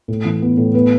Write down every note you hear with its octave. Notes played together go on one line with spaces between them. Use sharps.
A2
E3
B3
A2
B3 B4